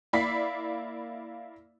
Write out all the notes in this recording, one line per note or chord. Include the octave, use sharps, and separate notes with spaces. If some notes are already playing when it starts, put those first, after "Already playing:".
A#3 E4 D5 B5 B6 C7